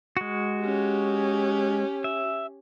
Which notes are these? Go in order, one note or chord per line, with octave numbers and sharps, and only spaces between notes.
G#3 F#4
C#4 G4
E5